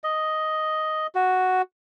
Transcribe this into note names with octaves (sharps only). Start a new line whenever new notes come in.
D#5
F#4